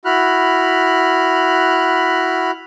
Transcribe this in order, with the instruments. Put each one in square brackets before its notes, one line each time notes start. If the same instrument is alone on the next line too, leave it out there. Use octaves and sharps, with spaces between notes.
[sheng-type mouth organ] E4 F#4 B5 F6 F#6